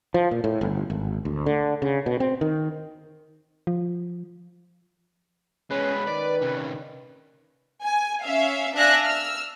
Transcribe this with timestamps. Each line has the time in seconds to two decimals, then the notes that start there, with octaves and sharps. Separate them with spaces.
0.14 F3
0.31 A#2
0.44 A2
0.61 G1
0.90 G#1
1.25 D2
1.46 D3
1.82 C#3
2.06 B2
2.20 C4
2.41 D#3
3.67 F3
5.71 G#3 B3 C#4 B4
6.07 D#3 D5
6.42 C3 C#4
7.83 G#5
8.24 C#4 E5 F5
8.75 D4 E5 F5 G#5 F#6 A#6
9.06 E6 F6